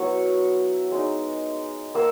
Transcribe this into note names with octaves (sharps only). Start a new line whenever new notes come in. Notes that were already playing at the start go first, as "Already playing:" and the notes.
Already playing: F#3 B3 E4 C#6
G#3 D#4
A#3 E6